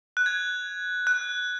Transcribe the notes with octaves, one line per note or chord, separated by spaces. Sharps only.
F#6
G#6
F#6